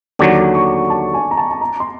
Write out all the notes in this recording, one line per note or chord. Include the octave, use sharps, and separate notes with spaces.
D#2 D3 F#3 D6
C#6
A5
G#5
A#5
A5
A5
A#5
C6